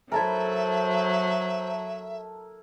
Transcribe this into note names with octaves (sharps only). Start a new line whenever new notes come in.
F#3 E4 A4 A#4 C5 E5